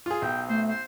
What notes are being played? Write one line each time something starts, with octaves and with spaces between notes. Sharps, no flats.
F4 G#4
B1 G5
A3 C5
C5